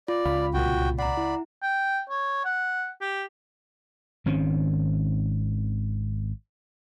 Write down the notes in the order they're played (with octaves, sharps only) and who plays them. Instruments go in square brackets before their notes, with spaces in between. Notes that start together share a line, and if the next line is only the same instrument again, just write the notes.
[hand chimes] F4 [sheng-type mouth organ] D5
[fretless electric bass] C#2 [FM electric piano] F5 B5
[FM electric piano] C2 A#2 [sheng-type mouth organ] F#4 G5
[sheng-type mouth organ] D5 B5 [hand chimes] F#5 A#5
[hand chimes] E4
[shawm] G5
C#5
F#5
G4
[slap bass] G#1 D#3 C4 C#4